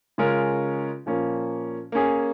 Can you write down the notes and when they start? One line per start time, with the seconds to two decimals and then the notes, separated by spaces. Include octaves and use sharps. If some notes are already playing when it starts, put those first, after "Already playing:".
0.18 C#3 G#3 C#4 F4 A#4
1.06 A#2 F3 A#3 C#4
1.92 A#3 C#4 G#4